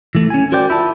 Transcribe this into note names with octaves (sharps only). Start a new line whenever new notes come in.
E3 A3
C#4 G#5
F#4 A#4 C5 D5 G5
E4 F4 A5